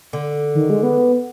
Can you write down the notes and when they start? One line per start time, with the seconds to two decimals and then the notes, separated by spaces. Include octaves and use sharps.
0.13 D3
0.55 D#3
0.70 G#3
0.83 B3